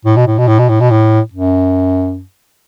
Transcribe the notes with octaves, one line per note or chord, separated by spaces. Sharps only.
A2
B2
A2
B2
A2
B2
A2
B2
A2
F#2